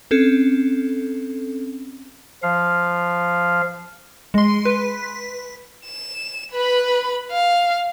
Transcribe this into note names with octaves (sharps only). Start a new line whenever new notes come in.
C4 C#4 A4
F3 F5
G#3 C6
B4
E7
B4 B5
F5